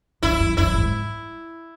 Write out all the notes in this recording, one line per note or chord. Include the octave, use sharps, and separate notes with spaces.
F#2 E4
F#2
F#2 E4
G#2